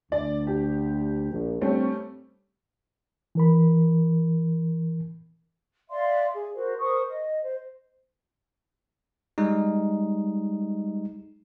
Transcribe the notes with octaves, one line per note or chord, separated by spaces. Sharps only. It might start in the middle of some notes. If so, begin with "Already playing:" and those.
D2 D5
G4
A#1
G2 G3 A3 C4 C#4
E3 A#4 B5
D5 E5 F5 C6
G#4
F#4 A#4 C5
A#4 C5 C#6 D#6
D#5
C5
G3 G#3 D#4